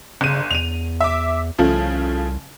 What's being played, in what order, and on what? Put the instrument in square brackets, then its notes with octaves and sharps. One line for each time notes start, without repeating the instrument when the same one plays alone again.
[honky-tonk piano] G1 D#7 [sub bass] C#3
[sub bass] E2 [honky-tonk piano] D#7 F7
[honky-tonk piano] E5 D6
[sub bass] C2 [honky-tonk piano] C#3 F3 A3